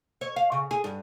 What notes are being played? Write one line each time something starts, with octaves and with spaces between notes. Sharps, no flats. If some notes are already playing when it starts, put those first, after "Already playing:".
C#5
F5
C#3
G#4
G2